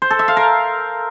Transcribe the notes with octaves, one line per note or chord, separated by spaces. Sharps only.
C5
A4
E5
F5
A#4